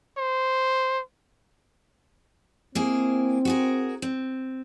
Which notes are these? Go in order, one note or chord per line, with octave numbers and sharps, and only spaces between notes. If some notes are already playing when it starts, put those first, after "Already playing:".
C5
A#3 C4 E4 G#4
F#4 G#4 A#4
C4